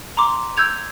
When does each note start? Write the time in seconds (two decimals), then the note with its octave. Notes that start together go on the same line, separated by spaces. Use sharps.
0.17 A#5 C6 D6
0.57 E6 G6 G#6 F7